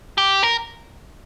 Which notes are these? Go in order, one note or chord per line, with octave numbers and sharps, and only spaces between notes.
G4
A#4